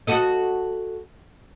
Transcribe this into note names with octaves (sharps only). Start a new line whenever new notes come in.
F#4 A4 D#5